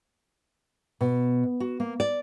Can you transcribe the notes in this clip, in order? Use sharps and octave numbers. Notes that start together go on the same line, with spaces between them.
B2
F#4
A#3
D5